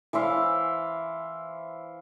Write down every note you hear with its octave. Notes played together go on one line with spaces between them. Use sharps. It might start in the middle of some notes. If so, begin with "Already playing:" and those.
E3 C5 E5 F5